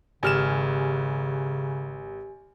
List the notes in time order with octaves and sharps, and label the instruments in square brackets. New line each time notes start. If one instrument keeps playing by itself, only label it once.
[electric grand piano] G#1 F6 E7 [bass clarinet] C#3 [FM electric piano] G4 G#5